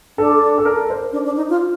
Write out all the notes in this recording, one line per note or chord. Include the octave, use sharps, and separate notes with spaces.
D4 A4
A4
A#4
C5
D4
D4
D#4
F4